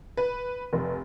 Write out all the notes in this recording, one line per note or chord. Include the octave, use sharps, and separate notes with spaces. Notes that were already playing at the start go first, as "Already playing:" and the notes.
B4
F1